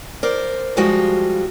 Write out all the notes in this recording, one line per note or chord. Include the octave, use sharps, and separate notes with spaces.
A#4 C5 D5
F3 G3 G#3 F4 F#4 G5